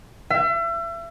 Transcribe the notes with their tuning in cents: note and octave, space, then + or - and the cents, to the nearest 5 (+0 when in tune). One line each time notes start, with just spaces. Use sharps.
E5 +35